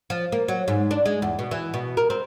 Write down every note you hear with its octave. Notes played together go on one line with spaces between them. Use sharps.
F3
A#3
F#3
G#2
D4
G#3
E2
B2
E3
B2
A#4
C4